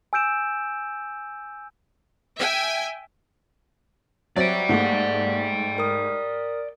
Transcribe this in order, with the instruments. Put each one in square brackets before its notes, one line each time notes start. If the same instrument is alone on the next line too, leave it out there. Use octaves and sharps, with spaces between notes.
[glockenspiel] G#5 E6 G6 D7 E7
[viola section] E5 G5 G#5
[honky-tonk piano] F#3 C4 [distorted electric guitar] D5 G5 [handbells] E5
[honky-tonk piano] G#2 A3 [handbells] A#3 F#5
[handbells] A#4 D#6